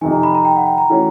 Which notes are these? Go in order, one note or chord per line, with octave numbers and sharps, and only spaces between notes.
F2 C3 D#3 G#5
A#5
B5
A#5
G5
F#5
G5
A#5
E3 A3 C#4 F#4